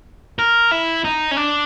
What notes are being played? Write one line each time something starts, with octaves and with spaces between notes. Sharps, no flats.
A#4
E4
D#4
C#4
D4